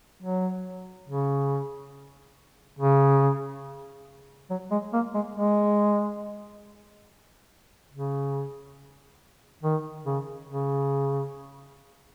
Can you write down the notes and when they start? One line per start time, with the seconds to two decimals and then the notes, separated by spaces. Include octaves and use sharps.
0.23 F#3
1.08 C#3
2.79 C#3
4.50 F#3
4.71 G#3
4.93 A#3
5.14 G#3
5.36 G#3
7.92 C#3
9.63 D#3
10.05 C#3
10.48 C#3